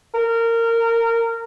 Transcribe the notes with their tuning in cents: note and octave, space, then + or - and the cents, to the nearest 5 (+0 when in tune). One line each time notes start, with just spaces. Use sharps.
A#4 -20